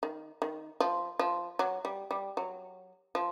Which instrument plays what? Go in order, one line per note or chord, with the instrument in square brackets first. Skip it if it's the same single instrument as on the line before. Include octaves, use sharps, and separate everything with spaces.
[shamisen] D#3
D#3
F3
F3
F#3
G3
G3
F#3
F3